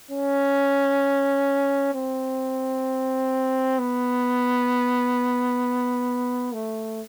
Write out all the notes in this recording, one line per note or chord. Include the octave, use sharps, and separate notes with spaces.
C#4
C4
B3
A3